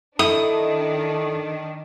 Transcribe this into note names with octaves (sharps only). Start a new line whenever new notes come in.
D#3 D4 E4 A4 D#6